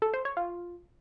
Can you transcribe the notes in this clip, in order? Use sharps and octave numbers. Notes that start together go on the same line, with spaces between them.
A4
C5
C#5
F4